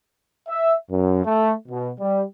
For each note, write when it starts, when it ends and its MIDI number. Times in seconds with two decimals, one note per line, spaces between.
0.48 0.74 76
0.91 1.23 42
1.25 1.53 57
1.69 1.91 47
2.00 2.22 55